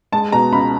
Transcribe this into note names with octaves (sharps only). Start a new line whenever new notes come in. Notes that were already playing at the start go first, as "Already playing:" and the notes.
G#3 A5
B2 A#5
C#2 B5